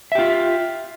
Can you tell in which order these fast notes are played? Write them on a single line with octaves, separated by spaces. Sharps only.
E5 G4 F4